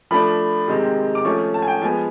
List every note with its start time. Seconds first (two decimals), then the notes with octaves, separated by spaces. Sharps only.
0.11 F3 A3 D4 B5
0.68 C3 D#3 G#3 C4
1.15 D6
1.25 F3 A3 C#4 C#6
1.54 A5
1.62 G#5
1.68 G5
1.82 F3 G#3 B3 G#5